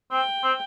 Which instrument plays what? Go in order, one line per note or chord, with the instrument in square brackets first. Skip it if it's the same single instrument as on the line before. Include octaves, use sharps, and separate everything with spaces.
[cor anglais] C4 [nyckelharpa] G5
[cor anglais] C4